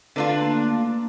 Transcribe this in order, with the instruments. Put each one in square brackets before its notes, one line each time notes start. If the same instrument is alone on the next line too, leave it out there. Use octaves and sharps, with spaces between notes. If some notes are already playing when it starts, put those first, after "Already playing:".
[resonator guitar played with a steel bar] D3 D4 F4 [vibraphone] A3 A4 B4
[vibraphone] A3 A#3 F5